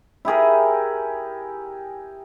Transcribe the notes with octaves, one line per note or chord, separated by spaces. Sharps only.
E4 G4 G#4 A#4